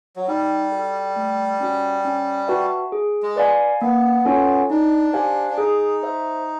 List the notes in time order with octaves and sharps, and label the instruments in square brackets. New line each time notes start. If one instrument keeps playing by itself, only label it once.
[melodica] F#3
[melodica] G3 [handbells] D#4
[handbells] F#4 A4
A3
C#4 F#4
C#4
F#4 B4 E5 A5
G#4
[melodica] G#3
[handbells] B4 D5 F5 G#5
[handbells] A#3 [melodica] B3
[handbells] C#4 F4 A4 C#5
[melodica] D4 [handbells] D#4
[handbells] G4 C5 F5 G#5
[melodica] D4
[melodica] D#4 [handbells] G#4
[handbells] C5 E5